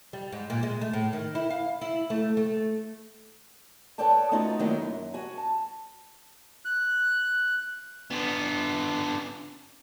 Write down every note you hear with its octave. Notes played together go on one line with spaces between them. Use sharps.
G3
G#2
A#2
G#3
A3
A2
D#3
E4
F5
E4
A3
A3
A4 B4 C#5 D5 G5 A5
A3 B3 C#4 D#4 F4 F#4
D#3 F#3 A3 A#3 D#4 E4
F#2
F#4 G#5
A5
F#6
D3 B3